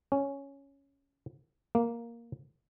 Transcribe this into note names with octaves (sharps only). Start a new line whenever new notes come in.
C#4
A#3